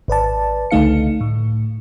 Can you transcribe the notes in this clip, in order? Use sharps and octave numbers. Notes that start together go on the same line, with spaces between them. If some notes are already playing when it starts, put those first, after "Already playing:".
G#1 B4 D5 A5
C#2 D3 A3 D#4 F5 C#7
A2